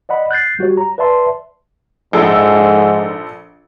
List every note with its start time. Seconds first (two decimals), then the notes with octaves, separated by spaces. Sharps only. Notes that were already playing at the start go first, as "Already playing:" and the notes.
0.09 D5 D#5 F#5 B5
0.31 F#6 G6 A6 C7
0.59 G3 F#4 G4 C#5
0.77 A#5
0.98 B4 D5 E5 A5 C6
2.13 A#1 G#2 A4